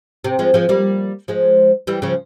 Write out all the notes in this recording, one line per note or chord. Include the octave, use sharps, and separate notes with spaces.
C3
F3 G#3
F3 G#3
G3 A#3
F3 G#3
E3 G3
C#3 F3